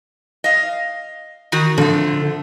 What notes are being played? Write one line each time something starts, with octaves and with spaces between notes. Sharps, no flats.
D#5 F5
D#3 F#4
D3 F3 A3